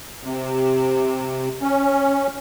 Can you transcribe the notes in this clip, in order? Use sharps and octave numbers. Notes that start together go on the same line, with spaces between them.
C3
C#4